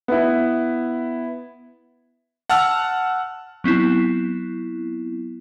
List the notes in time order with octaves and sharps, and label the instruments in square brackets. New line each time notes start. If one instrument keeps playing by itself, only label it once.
[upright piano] B3 E4
[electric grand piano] F#5 A5 E6 F6
[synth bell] F#3 B3 C4 E4